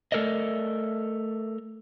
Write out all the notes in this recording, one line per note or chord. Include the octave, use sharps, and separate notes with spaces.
A3 A4 A#4 D5 D#5